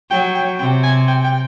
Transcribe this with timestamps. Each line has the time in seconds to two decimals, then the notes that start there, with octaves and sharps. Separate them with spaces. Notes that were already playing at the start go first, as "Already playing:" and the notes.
0.10 F#3 G5
0.35 G5
0.59 C3 G5
0.84 G#5
1.08 G5
1.24 G5